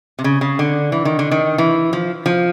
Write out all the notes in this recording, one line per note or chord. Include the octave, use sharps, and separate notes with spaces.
C3
C#3
C#3
D3
E3
D#3
D3
D#3
E3
F3
F3